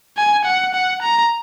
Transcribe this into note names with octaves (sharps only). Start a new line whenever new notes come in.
G#5
F#5
F#5
A#5